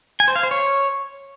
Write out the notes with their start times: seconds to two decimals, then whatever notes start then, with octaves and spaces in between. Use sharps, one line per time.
0.20 G#5
0.28 C5
0.36 F5
0.43 C5
0.51 C#5